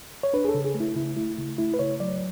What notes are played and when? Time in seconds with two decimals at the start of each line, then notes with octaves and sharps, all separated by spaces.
0.23 C#5
0.33 D4 B4
0.45 G#4
0.49 A4
0.55 C#3
0.64 G#4
0.75 A3
0.80 E4
0.96 C#3 E4
1.17 A3 E4
1.38 C#3
1.58 A3 E4
1.74 B4
1.79 C#3 C#5
2.00 F#3 D5